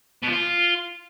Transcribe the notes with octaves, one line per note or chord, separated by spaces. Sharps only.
B2
F3
F4